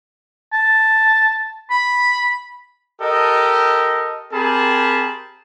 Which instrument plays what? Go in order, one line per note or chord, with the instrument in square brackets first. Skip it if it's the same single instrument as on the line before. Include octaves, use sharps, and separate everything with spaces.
[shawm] A5
B5
[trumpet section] G4 A4 A#4 D#5
C4 G4 G#4 A#4 A5 B5